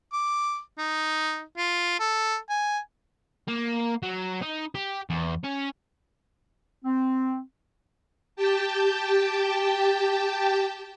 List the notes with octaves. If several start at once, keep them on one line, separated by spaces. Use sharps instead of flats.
D6
D#4
F4
A4
G#5
A#3
F#3
D#4
G4
E2
C#4
C4
G4 G5 A5